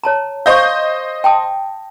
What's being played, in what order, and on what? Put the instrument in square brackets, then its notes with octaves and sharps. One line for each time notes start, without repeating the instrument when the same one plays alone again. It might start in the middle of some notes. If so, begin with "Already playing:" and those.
[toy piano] C#5 A5 A#5
[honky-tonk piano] C5 D#5 G6 [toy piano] F5 C#6
[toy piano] G5 A5 D#6